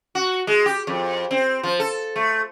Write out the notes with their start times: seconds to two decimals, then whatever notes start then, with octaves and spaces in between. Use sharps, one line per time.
0.15 F#4
0.47 G#3
0.66 G4
0.87 F2
1.31 C4
1.63 F3
1.80 A4
2.16 A3